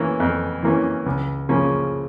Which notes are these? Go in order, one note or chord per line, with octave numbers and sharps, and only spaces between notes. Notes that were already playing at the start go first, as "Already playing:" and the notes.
Already playing: E3 A#3 C#4
F2
E3 A#3 C#4
C#2
C#3 F3 A#3 C#4